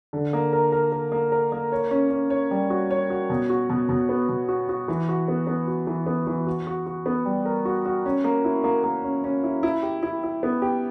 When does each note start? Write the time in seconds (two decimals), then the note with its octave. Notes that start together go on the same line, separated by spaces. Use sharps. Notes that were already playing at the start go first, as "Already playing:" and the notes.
0.13 D3
0.33 A#3
0.53 A#4
0.72 A#4
0.92 A#4
1.12 A#3
1.32 A#4
1.52 A#3
1.72 C#5
1.91 C#4
2.11 C#4
2.30 C#5
2.51 G3
2.70 F#4
2.91 C#5
3.10 F#4
3.30 B2
3.50 F#4
3.70 B2
3.89 B2
4.09 B3
4.29 B2
4.49 F#4
4.69 F#4
4.88 E3
5.09 F#4
5.28 B3
5.47 B3
5.67 F#4
5.87 E3
6.06 B3
6.27 E3
6.47 F#4
6.67 F#4
6.86 F#4
7.06 B3
7.25 G3
7.45 A#4
7.65 F#4
7.85 F#4
8.06 C#4
8.24 A#3
8.45 E4
8.64 A#3
8.84 A#3
9.04 C#4
9.24 C#4
9.44 E4
9.63 E4
9.83 G4
10.03 E4
10.23 E4
10.43 B3
10.62 G4